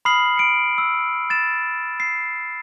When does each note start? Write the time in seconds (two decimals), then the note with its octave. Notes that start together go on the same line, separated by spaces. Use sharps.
0.05 B5 D#6 F6 C7 F#7
0.37 C#7 D7
0.78 E6
1.30 A6 E7
2.00 C7